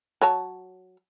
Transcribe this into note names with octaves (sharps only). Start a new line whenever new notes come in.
F#3 C#5 A5